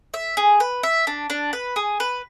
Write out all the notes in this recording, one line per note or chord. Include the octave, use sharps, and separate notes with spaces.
E5
G#4
B4
E5
D4
D4
B4
G#4
B4